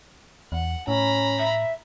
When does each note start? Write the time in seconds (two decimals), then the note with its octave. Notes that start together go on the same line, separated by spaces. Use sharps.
0.52 E2 F#5
0.88 A2 C#4 A#5 B5
1.39 E5